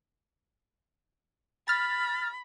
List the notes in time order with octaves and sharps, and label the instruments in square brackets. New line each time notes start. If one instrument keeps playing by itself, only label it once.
[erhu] B5 [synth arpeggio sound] F6 A6